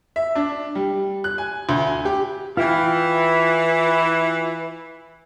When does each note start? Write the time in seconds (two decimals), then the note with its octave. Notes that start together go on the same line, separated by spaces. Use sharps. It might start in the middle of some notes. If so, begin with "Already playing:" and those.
0.16 E5
0.35 D4
0.75 G3
1.24 F#6
1.38 G#5
1.69 D2
1.87 G#5
2.05 G4
2.57 E3 F4 G5